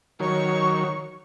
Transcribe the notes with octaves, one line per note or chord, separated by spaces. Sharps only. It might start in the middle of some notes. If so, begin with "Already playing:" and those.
D#3 F#3 C#5 C#6